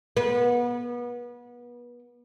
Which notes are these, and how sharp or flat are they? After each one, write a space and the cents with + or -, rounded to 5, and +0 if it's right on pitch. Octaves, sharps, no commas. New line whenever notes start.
B3 -30